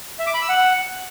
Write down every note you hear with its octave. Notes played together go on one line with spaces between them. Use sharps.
E5
D6
B5
E6
F#5